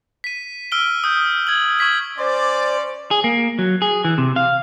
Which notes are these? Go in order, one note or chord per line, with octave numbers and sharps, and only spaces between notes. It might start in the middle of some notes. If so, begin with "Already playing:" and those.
B6 D#7
E6 F6 D7 G7
D#6 G6
G#6 F#7
C#6 G#6 B6 F#7
C#4 C5 D5
G#4
A#3
F#3
G#4
E3
C3
F5